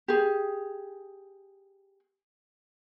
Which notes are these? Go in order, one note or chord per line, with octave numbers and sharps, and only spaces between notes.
G4 G#4